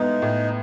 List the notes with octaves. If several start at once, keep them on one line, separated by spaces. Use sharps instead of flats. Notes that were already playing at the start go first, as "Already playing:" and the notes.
Already playing: A2 G#3 B3 D#4
A2